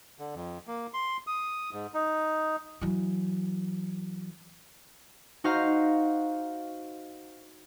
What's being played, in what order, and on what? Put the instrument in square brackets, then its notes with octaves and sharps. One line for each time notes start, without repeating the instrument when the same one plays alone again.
[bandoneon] D3
F2
A#3
C6
D#6
G#2
D#4
[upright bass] E3 F#3
[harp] D#4 F#4 C5 F5 A#5